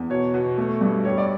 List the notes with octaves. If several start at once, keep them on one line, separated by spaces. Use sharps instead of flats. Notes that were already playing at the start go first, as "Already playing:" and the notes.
Already playing: E2
B2 C#5
B2
A3
G2
G3 C#5
D5